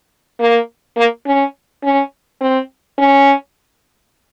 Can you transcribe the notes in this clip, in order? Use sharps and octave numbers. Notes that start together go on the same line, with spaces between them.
A#3
A#3
C#4
C#4
C4
C#4